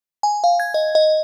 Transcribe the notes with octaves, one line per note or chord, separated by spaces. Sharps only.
G#5
F5
G#6
D#5
D#5